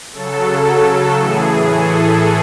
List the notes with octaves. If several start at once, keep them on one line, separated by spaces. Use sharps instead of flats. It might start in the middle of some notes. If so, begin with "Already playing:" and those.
C#3 F#3 A4
A2 E3 G#4
A4